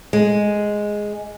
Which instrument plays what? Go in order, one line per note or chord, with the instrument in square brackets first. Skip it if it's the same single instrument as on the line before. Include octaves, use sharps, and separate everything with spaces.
[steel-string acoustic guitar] G#3